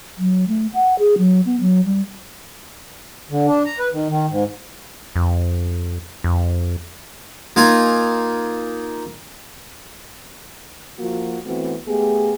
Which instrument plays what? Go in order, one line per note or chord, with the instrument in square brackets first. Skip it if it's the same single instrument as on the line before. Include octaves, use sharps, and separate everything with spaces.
[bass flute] F#3
A3
F#5
G#4
F#3
B3
F#3
G3
[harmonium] D3
D4
A#5
B4
D#3
D#3
G#2
[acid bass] F2
F2
[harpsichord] A#3 D#4 F4 G#5
[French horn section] F3 A#3 F4 F#4
E3 A3 B3 C4 F#4
A3 B3 G4 G#4